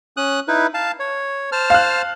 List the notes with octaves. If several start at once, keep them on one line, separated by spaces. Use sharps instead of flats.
C#4 D#6 F#6
D#4 E4 B4
F5 A5
C#5
C5 A5 F6
F5 F#6